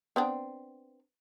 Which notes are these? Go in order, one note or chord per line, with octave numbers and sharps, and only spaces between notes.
B3 C4 D4